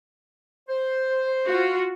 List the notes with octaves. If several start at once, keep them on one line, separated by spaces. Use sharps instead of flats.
C5
F4 F#4